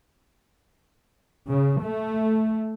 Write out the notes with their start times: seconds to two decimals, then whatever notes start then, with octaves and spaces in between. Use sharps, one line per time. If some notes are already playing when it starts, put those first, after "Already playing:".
1.50 C#3
1.82 A3